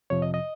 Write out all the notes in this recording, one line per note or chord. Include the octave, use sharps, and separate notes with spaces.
F2 C3 F3 C#5
D#5
D#5